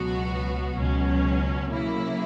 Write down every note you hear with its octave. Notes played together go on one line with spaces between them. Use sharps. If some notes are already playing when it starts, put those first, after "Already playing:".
Already playing: C#2 B2 F#3 B3 F#4
C#2 B2 F#3 C#4
C#3 F#3 A#3 E4